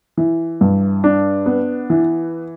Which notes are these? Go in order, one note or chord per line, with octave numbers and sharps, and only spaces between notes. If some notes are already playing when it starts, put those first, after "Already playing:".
E3
G2
D4
B3
E3